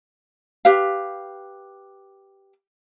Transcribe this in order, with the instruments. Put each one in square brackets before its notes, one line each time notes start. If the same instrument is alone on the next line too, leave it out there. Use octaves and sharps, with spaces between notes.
[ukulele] G4 B4 F5